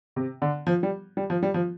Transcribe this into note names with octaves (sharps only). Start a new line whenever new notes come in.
C3
D3
F3
G3
G3
F3
G3
F3